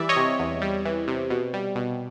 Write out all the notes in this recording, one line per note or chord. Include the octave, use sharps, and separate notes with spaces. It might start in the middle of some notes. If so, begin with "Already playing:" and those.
Already playing: E3 G3 D5 E5
C#5 D#5
C3
E2
G3
E3
C3
B2
G3
B2